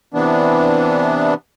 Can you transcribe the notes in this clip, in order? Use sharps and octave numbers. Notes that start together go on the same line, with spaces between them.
C3 E3 B3 D4